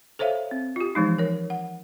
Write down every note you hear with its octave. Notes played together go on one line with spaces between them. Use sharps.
A4 C5 C#5 E5 F5
C4
F4 G4
E3 F3 G#3 D#4
A#4 C#5
F#5